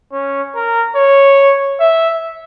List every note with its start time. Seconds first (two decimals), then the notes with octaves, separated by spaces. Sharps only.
0.12 C#4
0.55 A#4
0.96 C#5
1.80 E5